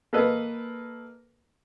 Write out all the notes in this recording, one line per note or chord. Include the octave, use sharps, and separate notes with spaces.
A#3 A4 B4 D#5